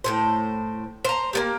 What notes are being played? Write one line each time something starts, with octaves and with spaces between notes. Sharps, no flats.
A2 C#3 C5
C5 A#5
A#3 B3 G4